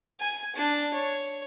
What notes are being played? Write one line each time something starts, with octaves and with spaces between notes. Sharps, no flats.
G#5
D4
C#5